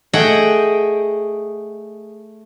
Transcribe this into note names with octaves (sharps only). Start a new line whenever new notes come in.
A3 G#4 D#5 F#5 G5